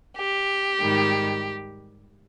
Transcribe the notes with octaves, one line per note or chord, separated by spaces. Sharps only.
G4
G#2 D#3 G3